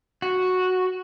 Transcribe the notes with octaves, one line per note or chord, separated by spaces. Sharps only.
F#4